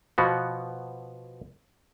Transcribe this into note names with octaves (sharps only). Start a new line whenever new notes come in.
B2 F3 B3 F#4